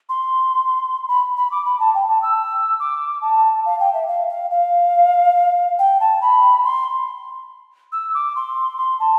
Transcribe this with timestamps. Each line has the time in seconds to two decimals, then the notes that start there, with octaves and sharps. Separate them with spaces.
0.09 C6
1.08 B5
1.37 B5
1.51 D6
1.65 B5
1.80 A5
1.94 G5
2.08 A5
2.22 E6
2.80 D6
3.22 A5
3.66 F5
3.80 G5
3.94 E5
4.07 F5
4.29 F5
4.50 F5
5.79 G5
6.00 A5
6.22 B5
6.64 C6
7.92 E6
8.14 D6
8.36 C6
8.78 C6
9.00 A5